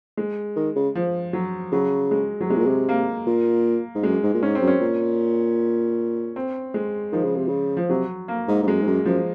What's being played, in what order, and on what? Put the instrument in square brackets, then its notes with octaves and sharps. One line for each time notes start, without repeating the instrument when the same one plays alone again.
[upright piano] G#3
[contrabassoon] D#3
C#3
[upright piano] F3
F#3
[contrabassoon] C#3 [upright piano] F#3
[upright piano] G#3
F#3
[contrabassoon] C3 [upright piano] G#3
[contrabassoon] A#2
C3
[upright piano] A#3
[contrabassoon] A#2
G#2
[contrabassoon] F#2 [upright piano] G#3
[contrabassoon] G#2
A#2
[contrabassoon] G#2 [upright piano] C#4
[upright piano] C4
[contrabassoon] F#2
[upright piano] C#4
[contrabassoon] A#2
[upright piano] C4
G#3
[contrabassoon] D#3 [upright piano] F3
[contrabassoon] C#3
C3
C#3
[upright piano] F3
[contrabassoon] C3 [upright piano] F#3
[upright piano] A#3
[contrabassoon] G#2
G#2
[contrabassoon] F#2 [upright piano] G#3
[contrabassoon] G#2
F#2
[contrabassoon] F#2 [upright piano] F3